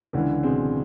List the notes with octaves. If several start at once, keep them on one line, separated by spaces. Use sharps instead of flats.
C#2 D3 E3
B2 G#3 C4